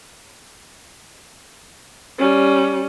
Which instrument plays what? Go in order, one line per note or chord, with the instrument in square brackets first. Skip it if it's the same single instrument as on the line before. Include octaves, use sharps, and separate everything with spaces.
[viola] G3 C#4